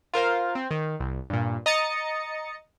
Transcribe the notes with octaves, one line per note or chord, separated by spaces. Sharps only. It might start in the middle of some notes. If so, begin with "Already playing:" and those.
F4 A#4 C5 F5
C4
D#3
C2
G2 A#2
D#5 A#5 D#6 A6 C#7